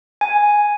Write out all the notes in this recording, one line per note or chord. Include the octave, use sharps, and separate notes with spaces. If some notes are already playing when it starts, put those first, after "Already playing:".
G#5